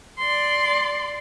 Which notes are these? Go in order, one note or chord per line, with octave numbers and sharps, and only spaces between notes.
D5 C6